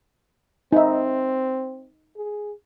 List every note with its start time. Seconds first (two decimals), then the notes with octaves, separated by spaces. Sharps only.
0.72 C4 D#4 E5
2.17 G#4